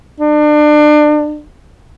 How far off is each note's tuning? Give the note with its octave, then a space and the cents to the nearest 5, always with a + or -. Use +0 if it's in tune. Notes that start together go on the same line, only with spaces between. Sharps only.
D4 +30